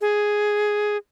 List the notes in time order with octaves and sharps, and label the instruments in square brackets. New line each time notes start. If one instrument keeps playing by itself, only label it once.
[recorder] G#4